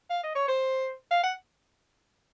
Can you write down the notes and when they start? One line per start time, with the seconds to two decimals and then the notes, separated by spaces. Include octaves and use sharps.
0.10 F5
0.24 D#5
0.36 C#5
0.48 C5
1.11 F5
1.23 F#5